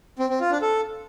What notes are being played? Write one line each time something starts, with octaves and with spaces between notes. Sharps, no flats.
C4
C4
F4
D4
A4